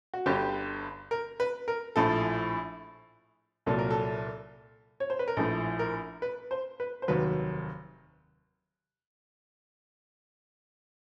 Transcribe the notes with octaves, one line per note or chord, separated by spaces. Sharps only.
F#4
G1 G2 D3 G4
A#4
B4
A#4
A#1 A2 F3 A4
C2 A#2 F#3 A4
A#4
A4
C#5
C5
B4
A#4
A#1 A2 F3 A4
A#4
B4
C5
B4
C5
F1 D#2 D#3 F#3 B4